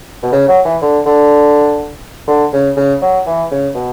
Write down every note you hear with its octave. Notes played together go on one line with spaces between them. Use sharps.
B2
C#3
F#3
E3
D3
D3
D3
C#3
C#3
F#3
E3
C#3
B2